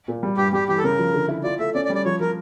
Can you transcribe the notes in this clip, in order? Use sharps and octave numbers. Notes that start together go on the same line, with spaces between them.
A#2
G3
G2 G4
G3 G4
E3 G4
A4
C#3 A#4
F3
D3
E4
F4 D5
A3 E5
C#4 D5
D5
G3
D5
F3 C#5
F3 A#4